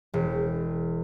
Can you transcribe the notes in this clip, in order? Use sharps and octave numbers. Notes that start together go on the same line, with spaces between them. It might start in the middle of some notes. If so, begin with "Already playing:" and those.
E1